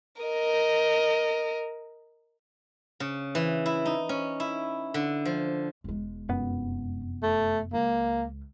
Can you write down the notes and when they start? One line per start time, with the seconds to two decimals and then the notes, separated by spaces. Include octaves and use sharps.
0.22 A#4 D#5
3.00 C#3
3.35 E3
3.66 E4
3.86 D#4
4.09 C#4
4.40 E4
4.94 D3
5.25 F3
5.84 E1 G#3
6.29 F1 F#2 B3
7.23 A3
7.73 C#2 A#3